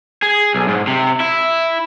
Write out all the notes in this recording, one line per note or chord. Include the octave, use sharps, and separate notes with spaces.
G#4
B1
G#2
C3
E4